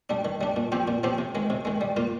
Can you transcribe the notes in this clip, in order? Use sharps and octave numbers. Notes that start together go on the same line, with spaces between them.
G3 D4
D#3
G3 D4
A#2
F3 C4 G4
A#2
F3 C4 G4
C3
D#3 G#3
C3
D#3 G#3
G3
A#3 F4